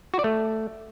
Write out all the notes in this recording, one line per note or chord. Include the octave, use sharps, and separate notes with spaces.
F#4
D5
A3